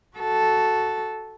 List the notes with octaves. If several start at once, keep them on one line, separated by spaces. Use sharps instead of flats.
F#4 A4